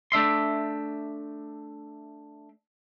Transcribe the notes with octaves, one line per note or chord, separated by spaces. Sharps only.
A3 D4 E5 C6